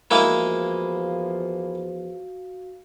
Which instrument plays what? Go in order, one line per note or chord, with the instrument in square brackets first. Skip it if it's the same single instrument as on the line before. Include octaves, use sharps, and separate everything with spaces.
[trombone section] E2 F3 [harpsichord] G#3 A#3 E4 [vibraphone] F#4 F5